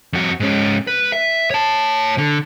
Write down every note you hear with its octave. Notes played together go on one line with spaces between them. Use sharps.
F2 F#4
G#2 C#4
B4
E5
C#5 A5
D3